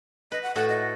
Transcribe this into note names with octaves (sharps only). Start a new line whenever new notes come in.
B4 D#5
F#5
A2 F#4 A4 F#5
D#5